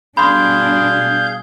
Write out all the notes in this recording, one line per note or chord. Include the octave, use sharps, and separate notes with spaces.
B2 G3 D4 G#4 F5 B5 C6 G6